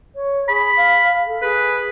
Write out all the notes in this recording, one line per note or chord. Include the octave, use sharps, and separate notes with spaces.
C#5
G#4 B5
F5
A4
G#4 B4